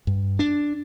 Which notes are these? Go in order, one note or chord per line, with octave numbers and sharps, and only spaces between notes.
G2
D4